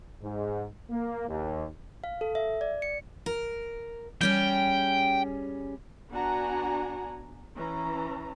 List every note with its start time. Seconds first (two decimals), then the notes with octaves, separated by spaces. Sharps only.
0.22 G#2
0.90 A#3
1.28 D#2
2.04 F5
2.21 A4
2.35 E5
2.61 D5
2.82 C#7
3.26 A#4
4.21 G3 C#4 G#4 G5
6.10 B3 D4 F#4 F#5 G#5 A#5
7.55 E3 C#4 A#5